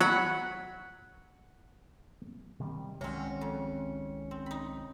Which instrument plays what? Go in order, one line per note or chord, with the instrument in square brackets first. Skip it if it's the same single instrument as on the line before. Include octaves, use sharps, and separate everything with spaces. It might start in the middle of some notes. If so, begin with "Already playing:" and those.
[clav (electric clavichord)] F#3 [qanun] F#5 B5
[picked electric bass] C3 D#3 G3
[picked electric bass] C2 D#3 G#3 [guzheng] F#3 C4 [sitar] C#4
[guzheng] F2
C4
D#4 B5